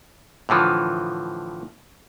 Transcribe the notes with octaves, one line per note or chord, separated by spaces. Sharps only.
A2 D3 E3 F3